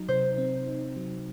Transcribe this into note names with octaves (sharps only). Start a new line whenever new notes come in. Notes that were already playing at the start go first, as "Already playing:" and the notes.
Already playing: F#3 D#4
C3 C5
C4
D#4
F#3